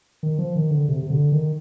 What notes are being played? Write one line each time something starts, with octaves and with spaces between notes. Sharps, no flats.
D#3
F3
D#3
D3
C3
C3
D3
D#3